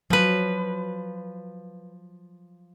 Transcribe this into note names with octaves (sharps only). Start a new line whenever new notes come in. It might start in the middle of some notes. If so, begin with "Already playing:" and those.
F3 F#3 B4